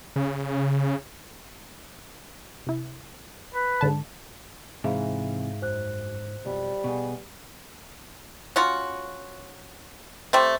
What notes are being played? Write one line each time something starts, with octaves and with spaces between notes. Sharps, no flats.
C#3
C3 E4
B4
G#2 D3 A5
G#2 C3 E3 G#4 E5 F5
F#2 C5 F#6
B1 F2 G3
B2 B3 G#4
C#4 F4 F#4
G3 A3 C4